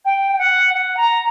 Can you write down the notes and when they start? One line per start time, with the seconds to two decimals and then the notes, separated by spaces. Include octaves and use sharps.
0.05 G5
0.32 G5
0.39 F#5
0.74 F#5
0.97 A#5